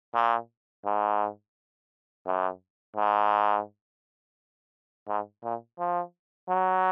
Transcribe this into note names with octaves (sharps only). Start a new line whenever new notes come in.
A#2
G#2
F#2
G#2
G#2
A#2
F3
F#3